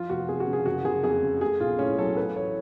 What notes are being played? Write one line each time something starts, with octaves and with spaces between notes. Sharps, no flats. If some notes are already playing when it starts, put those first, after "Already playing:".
Already playing: F3 F4
F1 F#4
F2 G#4
F#4
C#3
G#4
F#1 F#4
F#1 G#4
F2 G#4
C#3
A3 G#4
B1 F4
A2 C#4
F#3 A4
A3 B4
A1 C#5